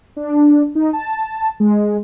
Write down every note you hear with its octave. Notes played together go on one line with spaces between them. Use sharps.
D4
D#4
A5
G#3